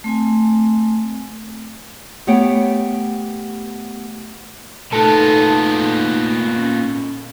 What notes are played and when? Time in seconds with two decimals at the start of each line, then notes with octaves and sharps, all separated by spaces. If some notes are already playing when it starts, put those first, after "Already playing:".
0.04 A3 C4 G#5
2.27 A3 B3 G4 C#5 F#5 G5
4.93 A#2 A3 B3 D#4 A4
6.56 C#4